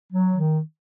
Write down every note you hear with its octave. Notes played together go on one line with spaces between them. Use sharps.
F#3
D#3